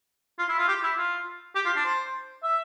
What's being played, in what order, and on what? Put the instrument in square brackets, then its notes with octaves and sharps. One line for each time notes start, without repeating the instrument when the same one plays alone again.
[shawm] F4
E4
F4
G4
E4
F4
G4
F4
D4
C5
E5